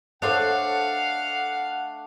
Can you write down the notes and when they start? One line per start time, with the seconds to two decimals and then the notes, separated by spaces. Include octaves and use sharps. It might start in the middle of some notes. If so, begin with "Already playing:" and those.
0.22 A3 D4 A4 C5 C#5 F5 F#5